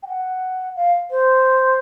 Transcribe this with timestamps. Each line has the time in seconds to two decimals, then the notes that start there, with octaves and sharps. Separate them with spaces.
0.03 G5
0.08 F#5
0.76 F5
1.11 C5